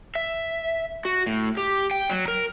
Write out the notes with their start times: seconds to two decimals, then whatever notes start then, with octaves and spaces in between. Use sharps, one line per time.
0.15 E5
1.05 F#4
1.26 A2
1.57 G4
1.91 G5
2.10 F#3
2.28 A#4